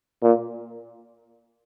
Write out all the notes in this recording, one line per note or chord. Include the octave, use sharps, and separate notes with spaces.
A#2